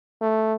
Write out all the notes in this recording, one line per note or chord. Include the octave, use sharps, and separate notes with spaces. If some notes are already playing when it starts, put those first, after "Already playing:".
A3